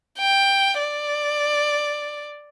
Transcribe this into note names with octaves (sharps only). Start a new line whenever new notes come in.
G5
D5